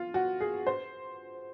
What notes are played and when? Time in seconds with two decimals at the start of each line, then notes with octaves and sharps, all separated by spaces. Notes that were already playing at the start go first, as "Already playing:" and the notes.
Already playing: F4
0.14 F#4
0.40 G#4
0.67 C5